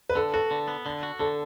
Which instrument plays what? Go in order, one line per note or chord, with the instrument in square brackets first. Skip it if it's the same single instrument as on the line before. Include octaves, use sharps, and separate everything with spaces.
[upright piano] B4
[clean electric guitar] D3 [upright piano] A4
[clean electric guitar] F#4 [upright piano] A4
[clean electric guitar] D3
B3
D3
F#4
[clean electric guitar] D3 [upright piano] A4